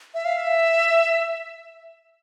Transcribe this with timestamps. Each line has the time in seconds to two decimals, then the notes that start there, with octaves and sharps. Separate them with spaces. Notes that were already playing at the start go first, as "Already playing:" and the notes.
0.14 E5
0.25 F5
0.37 E5